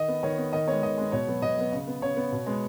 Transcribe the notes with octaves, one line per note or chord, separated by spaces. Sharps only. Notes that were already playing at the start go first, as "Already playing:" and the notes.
Already playing: D#3 D#5
B3
D#3 C#5
B3
D#3 D#5
G#3 B3 C#5
D#3 D#5
G#3 B3
B2 C#5
F#3 B3
B2 D#5
F#3 B3
C#3
B3
C#3 C#5
B3
B2
G#3 B3